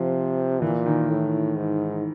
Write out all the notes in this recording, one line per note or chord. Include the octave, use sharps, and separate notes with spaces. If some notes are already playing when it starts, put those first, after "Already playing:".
Already playing: C3 F3
A#2 E3
D#3
A2
G#2